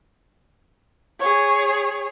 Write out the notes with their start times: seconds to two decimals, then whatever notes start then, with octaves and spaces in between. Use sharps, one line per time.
1.20 G#4 C#5